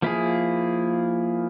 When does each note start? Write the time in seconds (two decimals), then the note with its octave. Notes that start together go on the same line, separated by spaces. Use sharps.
0.02 F3 A#3 E4 G#4